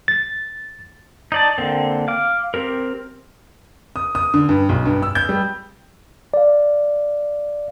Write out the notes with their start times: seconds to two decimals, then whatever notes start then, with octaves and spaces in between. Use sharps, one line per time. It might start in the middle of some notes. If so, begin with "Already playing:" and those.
0.08 A6
1.32 D#4 D5 A5
1.58 D3 A#3 C4
2.08 F5 D6
2.54 C4 G4 A#4
3.96 D#6
4.15 D#6
4.34 D3
4.49 G2
4.69 B1
4.85 G2
5.02 E6
5.15 G6
5.29 G3
6.34 D5 F5